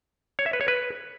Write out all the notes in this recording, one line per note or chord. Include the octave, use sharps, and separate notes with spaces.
C#5
E5
B4
C#5
B4